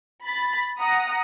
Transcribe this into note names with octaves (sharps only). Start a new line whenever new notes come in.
B5 A6 B6
F#5 A#5 D#6